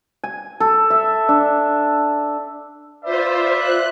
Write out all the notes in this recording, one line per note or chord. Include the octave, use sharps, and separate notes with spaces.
G#5
A4
E5
D4
F4 B4 C5 D5 E5
F#6